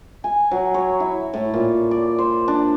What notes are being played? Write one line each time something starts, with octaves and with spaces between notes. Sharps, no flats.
G#5
F#3
C#5
E4
A2
A#2
D5
C5
D4